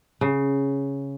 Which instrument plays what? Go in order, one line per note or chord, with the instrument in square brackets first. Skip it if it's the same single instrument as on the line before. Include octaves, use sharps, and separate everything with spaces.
[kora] C#3